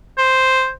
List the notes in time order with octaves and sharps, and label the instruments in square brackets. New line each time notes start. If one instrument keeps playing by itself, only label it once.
[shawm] C5